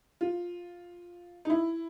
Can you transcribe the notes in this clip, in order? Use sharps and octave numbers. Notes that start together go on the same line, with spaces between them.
F4
D#4
E4